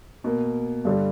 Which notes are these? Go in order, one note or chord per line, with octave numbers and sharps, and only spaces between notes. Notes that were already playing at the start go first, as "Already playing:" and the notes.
B2 A#3
G2 D3 G3